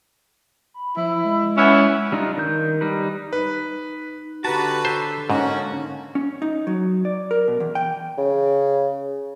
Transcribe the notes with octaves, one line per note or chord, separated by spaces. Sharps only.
B5
F3 E4
G#3
E3 B3 C#4 E4
G3 D4 D#4 F4
D#3 G6
G3 D#4 B4
D#4 B4
D3 F#4 G4 B4 A5 A#5
C5 E6
G#2 A#3 C#4 D#4 F#4
C#4
D#4
F#3
D5
A#4
B2
E2
G5
C#3